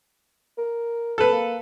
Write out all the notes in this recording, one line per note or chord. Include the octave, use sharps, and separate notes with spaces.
A#4
A4 B4
A#3